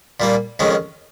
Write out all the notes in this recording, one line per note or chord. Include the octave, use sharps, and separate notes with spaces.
A#2 G3 A#3
F2 D#3 G#3 C#4